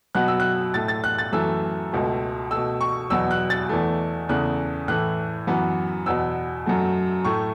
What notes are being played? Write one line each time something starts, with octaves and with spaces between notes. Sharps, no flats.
B2 F#3 B3 F#6
E6
F#6
A2 A3 A6
A6
F#6
A6
F#2 E3 A3 E6
C#2 B2 A3
B2 A3 E6
C#6
E2 B2 F#3 B3 E6
F#6
A6
E2 E3 A3
E2 C#3 E3 A3 F#6
A2 E3 A3 F#6
F#2 E3 B3
E2 B2 B3 E6
F#2 F#3 A3
A2 A3 C#6